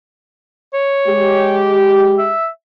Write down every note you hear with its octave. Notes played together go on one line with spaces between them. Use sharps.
C#5
G#3 G4
E5